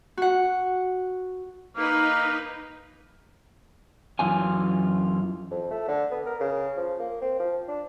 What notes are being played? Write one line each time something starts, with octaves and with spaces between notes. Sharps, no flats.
F#4 F#5
A#3 D#4 B4
F#2 E3 F4 G#5
F2
A3
D3
B3
A#4
C#3
F3
A#3
C4
F3
D4